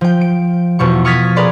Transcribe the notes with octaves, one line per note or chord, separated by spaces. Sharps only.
F3 G5
D7
E2 B2 F3 C#6
C#6 D#6 F6 G#6 A6 B6
G#4 A#4 B4 D5 C6